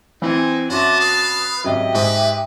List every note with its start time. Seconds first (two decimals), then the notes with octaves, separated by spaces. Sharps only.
0.22 E3 C4 D#4 G#5
0.70 F#2 F#4 D#5 E5 A5 C6 D6
1.00 B4 F5 D#6
1.64 G#1 C#3 F#3 G4 D#5 E5 G5
1.95 G#2 B4